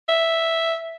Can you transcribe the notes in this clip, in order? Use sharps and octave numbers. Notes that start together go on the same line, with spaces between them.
E5